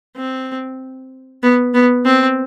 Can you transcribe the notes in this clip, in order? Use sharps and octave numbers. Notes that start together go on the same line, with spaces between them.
C4
B3
B3
C4